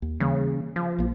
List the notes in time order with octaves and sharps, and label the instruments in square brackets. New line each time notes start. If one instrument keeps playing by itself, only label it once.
[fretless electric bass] D#2
[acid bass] C#3 [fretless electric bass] E3 G3 A#3
[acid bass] F3
[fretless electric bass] A#1 A#3